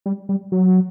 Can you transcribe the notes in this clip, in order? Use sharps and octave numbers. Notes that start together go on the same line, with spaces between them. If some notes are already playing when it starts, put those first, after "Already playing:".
G3
G3
F#3